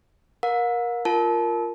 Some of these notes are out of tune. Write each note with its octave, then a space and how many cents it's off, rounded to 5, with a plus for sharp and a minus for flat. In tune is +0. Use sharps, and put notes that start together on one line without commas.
A#4 +20 F5 +45
F4 +0 A#4 +0 A5 -25